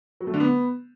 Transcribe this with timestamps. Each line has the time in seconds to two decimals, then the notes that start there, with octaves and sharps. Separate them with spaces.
0.21 F#3
0.27 A3
0.34 D3
0.40 B3